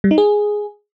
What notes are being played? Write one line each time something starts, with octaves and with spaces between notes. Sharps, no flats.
G3
D#4
G#4